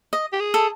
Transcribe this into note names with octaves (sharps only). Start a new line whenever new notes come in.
D#5
G4
G#4
A4